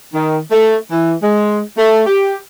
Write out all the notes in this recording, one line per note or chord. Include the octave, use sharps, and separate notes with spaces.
D#3
A3
E3
G#3
A3
G4